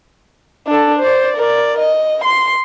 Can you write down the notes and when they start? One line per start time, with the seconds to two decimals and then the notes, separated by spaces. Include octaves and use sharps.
0.67 D4 A4
0.99 C5 D5
1.37 A#4 D5
1.79 D#5
2.25 C6